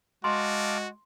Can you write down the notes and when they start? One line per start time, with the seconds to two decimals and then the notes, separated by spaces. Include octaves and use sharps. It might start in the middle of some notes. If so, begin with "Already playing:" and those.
0.24 G#3 F#4 F5 A5 C6 D6